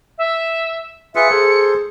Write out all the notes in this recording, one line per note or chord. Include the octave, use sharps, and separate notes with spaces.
E5
F4 G#4 B4 E5 C#7
G#4 A4 C5